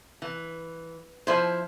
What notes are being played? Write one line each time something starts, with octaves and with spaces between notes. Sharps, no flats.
E3
F3 E4 C5